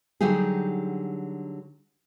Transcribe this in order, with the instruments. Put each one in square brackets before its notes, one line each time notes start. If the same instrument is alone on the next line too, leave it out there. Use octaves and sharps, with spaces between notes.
[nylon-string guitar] D3 F#3 G3 D#4 G4 G#4